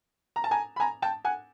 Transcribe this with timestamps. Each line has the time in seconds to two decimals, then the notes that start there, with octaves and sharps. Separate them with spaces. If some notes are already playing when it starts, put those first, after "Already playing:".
0.36 A#5
0.44 A5
0.51 G#5 A#5
0.76 B5
0.80 G#5 A#5
1.02 G5 A5
1.25 F#5 G#5